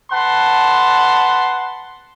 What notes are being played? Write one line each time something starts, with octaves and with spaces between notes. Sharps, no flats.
B4 F#5 A5 C6